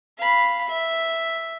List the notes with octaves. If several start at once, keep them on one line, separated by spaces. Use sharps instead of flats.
F5 B5
E5